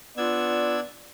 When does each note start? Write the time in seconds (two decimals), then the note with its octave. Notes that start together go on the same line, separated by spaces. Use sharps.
0.17 B3 D4 F4 D5 E6 G#6